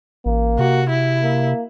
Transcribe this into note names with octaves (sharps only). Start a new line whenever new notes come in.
A1 A#3
C3 F#4
E4
A#3